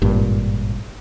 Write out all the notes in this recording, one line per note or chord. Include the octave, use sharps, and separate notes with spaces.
G#1 G2 A#2